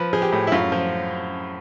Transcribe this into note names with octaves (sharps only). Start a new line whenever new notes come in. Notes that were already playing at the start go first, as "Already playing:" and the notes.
Already playing: F3 B4
F3 G#4
G4
A2
E4
F#2 F4
F3